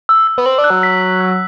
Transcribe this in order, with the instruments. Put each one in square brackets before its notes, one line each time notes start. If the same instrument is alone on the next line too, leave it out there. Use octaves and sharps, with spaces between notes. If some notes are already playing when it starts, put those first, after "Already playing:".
[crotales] E6
E6
[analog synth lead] B3
[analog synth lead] C4 [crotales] F#7
[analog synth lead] D4
[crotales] F#6
[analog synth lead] F#3
[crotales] B6
B6
F#6